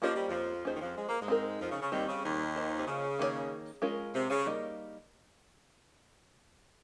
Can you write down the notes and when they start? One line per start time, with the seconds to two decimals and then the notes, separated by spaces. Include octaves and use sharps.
0.02 F3 A#3 C#4 G4 C5 D#5
0.15 G3
0.28 F2 F3
0.65 D#2 D#3 C#4 F4 G#4 C5
0.75 D#3
0.81 F2 F3
0.96 G#3
1.09 A#3
1.20 G#2 G#3
1.28 C4 D#4 A#4
1.60 F2 F3
1.71 C#3
1.81 C#3
1.92 D#2 D#3 G3 C4 G4
2.08 C#3
2.24 D#2 D#3
2.56 A#3 F4 C5 D#5
2.77 C3
2.87 C#3
3.19 D#3 A#3 C#4 G#4 C#5
3.82 G#3 C#4 F4 A#4
4.14 C3
4.30 C#3
4.46 G3 A#3 D#4 A#4 D#5